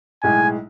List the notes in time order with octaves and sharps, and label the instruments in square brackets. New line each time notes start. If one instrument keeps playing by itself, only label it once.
[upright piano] B1 A2 G#3 [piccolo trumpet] G#5